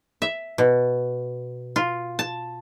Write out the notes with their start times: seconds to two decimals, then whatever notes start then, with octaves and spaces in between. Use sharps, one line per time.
0.22 E5
0.58 B2
1.76 F4
2.19 A5